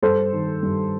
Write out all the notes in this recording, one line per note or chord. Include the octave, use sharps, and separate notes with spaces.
G2 A4 C5
D#3
G2